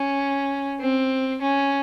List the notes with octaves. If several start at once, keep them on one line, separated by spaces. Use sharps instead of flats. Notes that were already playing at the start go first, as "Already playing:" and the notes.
Already playing: C#4
C4
C#4